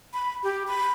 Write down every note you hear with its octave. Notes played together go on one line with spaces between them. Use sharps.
B5
G4
B5